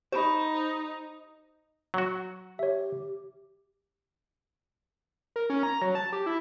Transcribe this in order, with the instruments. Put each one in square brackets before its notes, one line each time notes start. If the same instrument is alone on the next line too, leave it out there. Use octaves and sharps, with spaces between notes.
[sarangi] D#4 [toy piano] G4 B5 [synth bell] C5
[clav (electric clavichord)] F#3 F#4
[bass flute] G4 [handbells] C#5 E5
[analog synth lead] A#4
C#4
A#5
F#3
A5
G4
E4